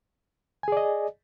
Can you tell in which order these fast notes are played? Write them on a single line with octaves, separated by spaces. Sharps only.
G#5 G#4 D5 D#5